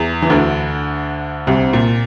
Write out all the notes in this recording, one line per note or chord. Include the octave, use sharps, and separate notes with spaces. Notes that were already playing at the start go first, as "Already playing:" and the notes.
Already playing: E2
E3
D2 D3
C2 C3
A#2